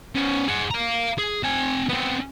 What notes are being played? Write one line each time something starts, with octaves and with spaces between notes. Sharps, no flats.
B3 C#4
G#4 F#5
F5 A#5
G#4
C4 G#5
B3 C4